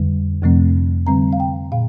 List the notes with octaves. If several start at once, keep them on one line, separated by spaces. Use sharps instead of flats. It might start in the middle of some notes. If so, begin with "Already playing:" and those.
Already playing: F2 D3 G3
F2 C3 F3 A3 C4
D3 G3 C4 A#5
F5
G5
A#2 F5